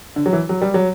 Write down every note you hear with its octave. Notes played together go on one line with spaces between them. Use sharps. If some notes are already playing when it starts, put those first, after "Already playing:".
D3
F#3
E3
F#3
G3
F#3